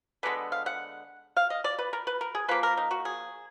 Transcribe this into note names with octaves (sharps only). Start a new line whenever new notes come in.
D3 G#3 B3 B4
F5
F#5
F5
D#5
D5
B4
A#4
B4
A#4
G#4
F3 A#3 B4
A#4
D#4
F#4
G#4